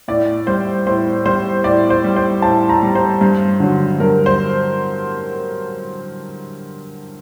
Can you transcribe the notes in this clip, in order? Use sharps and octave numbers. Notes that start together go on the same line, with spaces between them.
A2 D5
G3 C5
A2 C5
G3 C5
A2 D5
C5
G3
C5
A2 A5
A#5
G3
C5
G2
D3 F#3
G2 A#4
C5